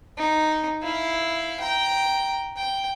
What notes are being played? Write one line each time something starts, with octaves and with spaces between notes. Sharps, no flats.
D#4
E4 F5
G5 A#5
G5